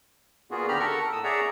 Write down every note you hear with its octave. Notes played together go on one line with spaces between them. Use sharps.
A#2 A#3 B3 F4 F#4 G#4
D#2 D3 G4 A#5 B5 F6
A4 A#4 F#5 C#6
A2 D#6 E6
G#4 C#5 D5 E5 F#5 A#5